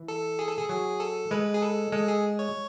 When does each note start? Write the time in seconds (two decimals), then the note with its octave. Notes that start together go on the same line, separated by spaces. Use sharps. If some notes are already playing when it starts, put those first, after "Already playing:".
Already playing: E3
0.08 A4
0.39 G#4
0.48 A4
0.57 G#4
0.69 F#3 G#4
1.00 A4
1.31 G#3 B4
1.54 G#4
1.62 A4
1.92 G#3 A4
2.08 G#4
2.39 C#5